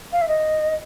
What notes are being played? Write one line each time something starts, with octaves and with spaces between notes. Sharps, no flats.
F5
E5
D#5